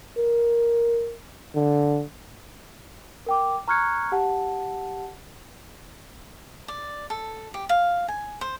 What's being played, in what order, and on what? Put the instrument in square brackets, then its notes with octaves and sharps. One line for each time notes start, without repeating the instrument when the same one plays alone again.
[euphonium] A#4
D3
[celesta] A#4 G5 D6
A#5 C#6 F6 F#6 G#6 C#7
G4 F#5 A5
[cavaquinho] D5
A4
G4
F5
G#5
C5